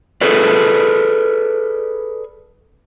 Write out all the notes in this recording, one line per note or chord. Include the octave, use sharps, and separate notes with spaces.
G#4 A4 B4 D5